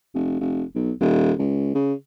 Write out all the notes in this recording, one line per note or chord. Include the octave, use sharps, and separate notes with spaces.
F1
F1
B1
D#1
C#2
C#3